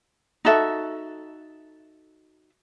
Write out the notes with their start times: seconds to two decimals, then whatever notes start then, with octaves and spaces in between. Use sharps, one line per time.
0.45 D#4 F#4 A4 E5